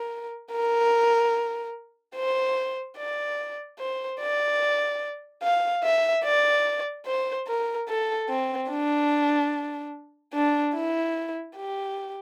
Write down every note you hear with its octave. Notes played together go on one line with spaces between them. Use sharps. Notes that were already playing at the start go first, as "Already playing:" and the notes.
Already playing: A#4
A#4
C5
D5
C5
D5
F5
E5
D5
C5
A#4
A4
C4
D4
D4
E4
G4